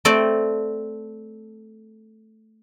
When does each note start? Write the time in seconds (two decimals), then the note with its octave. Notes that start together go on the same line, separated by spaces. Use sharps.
0.05 A3 C4 D5 G5